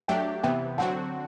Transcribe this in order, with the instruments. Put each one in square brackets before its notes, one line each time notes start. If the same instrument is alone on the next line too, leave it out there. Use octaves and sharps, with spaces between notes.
[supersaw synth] F#3 A3 D4 G4 [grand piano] E5 G5
[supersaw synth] C3 E3 B3 [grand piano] E5 G5
[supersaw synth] D3 F#3 C4 F#4 [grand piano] F#5 A5